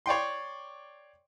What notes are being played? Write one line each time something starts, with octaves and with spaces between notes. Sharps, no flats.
C#5 D5 G5 C6